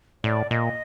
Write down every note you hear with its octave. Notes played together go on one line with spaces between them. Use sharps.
A2 D5
A#2 D#5